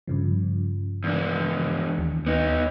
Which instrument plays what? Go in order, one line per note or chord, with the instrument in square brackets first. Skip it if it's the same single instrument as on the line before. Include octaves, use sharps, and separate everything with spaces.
[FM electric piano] G2 C#3 F3
[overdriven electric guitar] E2 D4
[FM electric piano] D#2
[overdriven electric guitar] B3 D#4